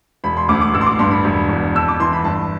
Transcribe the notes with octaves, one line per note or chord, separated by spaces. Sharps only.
E1 B5
C6
D2 D6
D6
A1 E6
C6
D6
G2 C6
B5
E1
E2
F2 E6
D6
E3 C6
B5
G1 A5